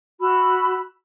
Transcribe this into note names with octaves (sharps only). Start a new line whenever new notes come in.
F#4 B5 E6